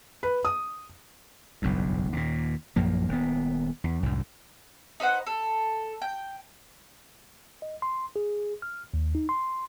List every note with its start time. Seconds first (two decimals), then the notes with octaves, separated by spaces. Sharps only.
0.23 B4
0.45 D#6
1.62 F#1 B1 E2 G2
2.13 D#2 A#2
2.76 A#1 F#2 F3 A#3
3.08 D#1 B3
3.84 E2
4.03 C2 F#2 A2
5.00 D#4 B4 C5 F#5
5.26 A4
6.02 G5
7.62 D#5
7.82 C6
8.16 G#4
8.62 F6
8.94 D#2
9.15 D#4
9.29 C6